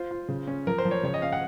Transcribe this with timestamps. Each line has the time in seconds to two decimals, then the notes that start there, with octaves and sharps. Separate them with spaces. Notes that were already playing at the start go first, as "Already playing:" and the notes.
Already playing: F4 C5
0.11 F4
0.28 C#3
0.47 C#4
0.67 F3 A#4
0.78 C5
0.85 F3
0.91 C#5
1.03 C#3 C#5
1.14 D#5
1.22 C#4 F5
1.33 F#5